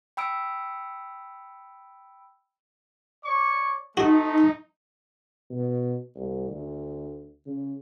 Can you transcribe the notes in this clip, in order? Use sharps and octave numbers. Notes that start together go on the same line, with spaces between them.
G5 B5 E6 D7
C#5 D5 C#6
A3 C4 D#4 F#4 D#5
B2
C2
D2
C#3